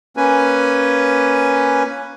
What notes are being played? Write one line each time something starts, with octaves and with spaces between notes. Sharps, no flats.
A#3 C#4 B4 G#5